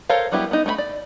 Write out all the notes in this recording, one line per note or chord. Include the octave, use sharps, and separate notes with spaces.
A4 A#4 C5 C#5 F5
F#3 G3 B3 E4 G4
B3 D#4
A3 E4 B5
D5